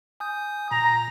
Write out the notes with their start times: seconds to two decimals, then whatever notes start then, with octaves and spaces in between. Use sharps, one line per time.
0.20 G#5 D#6 G6
0.71 A#2 A#5